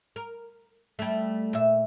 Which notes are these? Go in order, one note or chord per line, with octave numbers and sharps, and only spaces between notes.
A#4
G3 A3
A#2 E5